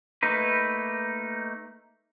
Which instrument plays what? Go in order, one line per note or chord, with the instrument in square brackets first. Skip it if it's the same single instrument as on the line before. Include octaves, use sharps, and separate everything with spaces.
[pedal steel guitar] A3 A#3 D#4 B4